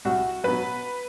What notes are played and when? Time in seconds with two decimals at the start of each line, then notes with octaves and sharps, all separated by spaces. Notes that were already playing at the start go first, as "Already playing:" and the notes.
0.05 C2 F#4
0.43 B2 F#3 B4